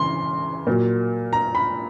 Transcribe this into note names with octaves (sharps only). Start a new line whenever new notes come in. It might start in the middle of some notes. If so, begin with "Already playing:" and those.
Already playing: C#3 E3 C6
A#2 F#3 A#3
A#5
B5